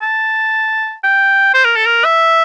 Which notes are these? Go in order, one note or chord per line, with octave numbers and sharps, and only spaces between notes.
A5
G5
C5
A#4
A4
A#4
E5